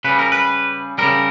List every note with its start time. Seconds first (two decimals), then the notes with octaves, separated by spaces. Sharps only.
0.04 C#3 G3 B4
0.19 A#4
0.32 B4
0.98 C#3 G3 A#4